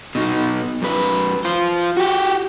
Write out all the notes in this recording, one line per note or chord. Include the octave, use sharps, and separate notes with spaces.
B2 D#4
F#2 B4
F4 C5
F#4 G4